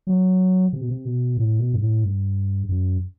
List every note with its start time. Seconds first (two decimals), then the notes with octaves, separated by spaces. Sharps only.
0.07 F#3
0.73 C3
0.81 B2
0.89 C3
1.05 B2
1.37 A2
1.60 B2
1.73 G2
1.81 A2
2.04 G2
2.69 F#2